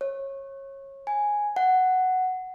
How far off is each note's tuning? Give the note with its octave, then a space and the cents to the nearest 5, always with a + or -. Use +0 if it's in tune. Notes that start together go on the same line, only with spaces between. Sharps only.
C#5 -25
G#5 +0
F#5 +5